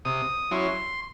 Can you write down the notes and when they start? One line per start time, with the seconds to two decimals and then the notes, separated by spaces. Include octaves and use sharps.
0.05 C3 D#6
0.51 F#3 C#4 E4 C6